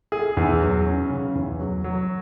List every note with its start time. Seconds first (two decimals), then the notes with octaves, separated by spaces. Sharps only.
0.12 G#4
0.37 E2
0.61 F#3
0.86 C#4
1.10 C#3
1.35 E2
1.60 F#3
1.84 F#3